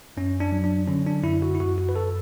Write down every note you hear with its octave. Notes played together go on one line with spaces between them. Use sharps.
F#2 C#4
D4
F#3
D4
D3 C#4
D4
F#2 E4
F#4
E4
F#2 F#4
F#4
B4
F#2 A4